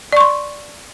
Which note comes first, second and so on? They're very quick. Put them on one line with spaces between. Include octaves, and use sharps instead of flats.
D5 C#6 C6